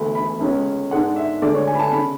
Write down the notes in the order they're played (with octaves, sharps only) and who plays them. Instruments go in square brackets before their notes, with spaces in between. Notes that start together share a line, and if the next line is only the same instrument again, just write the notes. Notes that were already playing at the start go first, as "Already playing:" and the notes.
Already playing: [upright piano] E1 D2 D3 A3 B5
B5
C#2 C#3 G#3 C#4
G#2 G#3 D4 F#5
E5
D2 D3 G#3 D5
C#5
G#5
B5
A5
C#3 B5